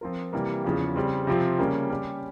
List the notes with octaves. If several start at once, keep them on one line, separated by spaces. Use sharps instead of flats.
F3 C4 F4 A#4
C3 E3 G3 A#3
E2 C#3 F3
C#3 G3 C4
C3 F3 C4 F4
C#3 G3 A#3 C#4
G3 C#4 G4